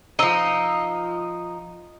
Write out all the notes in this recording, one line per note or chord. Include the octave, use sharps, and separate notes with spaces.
F3 D#4 D#5 E6